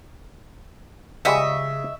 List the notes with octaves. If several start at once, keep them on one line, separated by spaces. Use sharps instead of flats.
C#3 F3 G3 G#3 D#5 E5 C#6